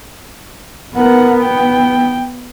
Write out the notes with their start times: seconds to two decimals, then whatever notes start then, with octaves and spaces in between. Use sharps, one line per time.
0.96 B3 A#4 F#5
1.42 G5